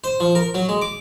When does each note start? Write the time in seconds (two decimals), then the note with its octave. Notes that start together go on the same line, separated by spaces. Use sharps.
0.04 C5
0.20 F3
0.35 A#4
0.54 F#3
0.69 G#3
0.82 D6